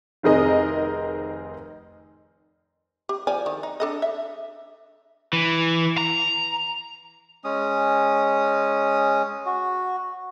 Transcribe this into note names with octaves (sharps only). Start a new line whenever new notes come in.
F1 D#3 C4 G#4 A#4 D#5
G4
F3 D5 G#5
D#3
D#4
D4 A4 D#5
E5
E3
A#5
G#3 C#4 D#6
F#4